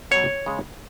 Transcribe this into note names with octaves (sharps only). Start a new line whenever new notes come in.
B2 F#3 C#5
C#3 G#3